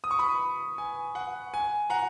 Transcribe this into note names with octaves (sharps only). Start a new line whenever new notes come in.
D#6
C#6
B5 D#6
G#5
F#5
G#5
F#5 A#5